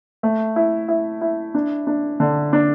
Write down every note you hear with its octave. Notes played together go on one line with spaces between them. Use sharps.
A3
E4
E4
E4
D4
D4
D3
D4